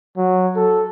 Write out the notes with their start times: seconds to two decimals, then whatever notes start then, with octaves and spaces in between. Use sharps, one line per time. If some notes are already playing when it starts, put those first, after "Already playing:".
0.17 F#3
0.56 A4